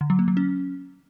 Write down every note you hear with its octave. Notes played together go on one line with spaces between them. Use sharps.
D3
F#3
A#3
F#3
C#4